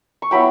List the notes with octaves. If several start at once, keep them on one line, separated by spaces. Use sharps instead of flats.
C#6
F#3 B3 E4 G5 B5